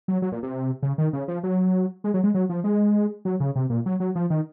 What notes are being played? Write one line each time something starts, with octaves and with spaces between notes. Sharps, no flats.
F#3
F#3
A#2
C3
C#3
D#3
C#3
F3
F#3
G#3
F#3
G#3
F#3
F3
G#3
F#3
C#3
C3
A#2
F#3
F#3
F3
D#3